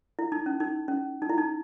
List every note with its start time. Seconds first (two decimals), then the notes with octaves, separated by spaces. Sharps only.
0.19 E4
0.32 D#4
0.46 C#4
0.60 D#4
0.88 C#4
1.22 D#4
1.30 E4
1.38 D#4